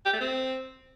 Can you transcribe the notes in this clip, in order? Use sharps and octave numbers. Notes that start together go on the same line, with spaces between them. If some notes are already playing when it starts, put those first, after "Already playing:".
G4
A3
C4